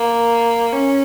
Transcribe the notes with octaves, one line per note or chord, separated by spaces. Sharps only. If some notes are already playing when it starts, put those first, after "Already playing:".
Already playing: A#3
C#4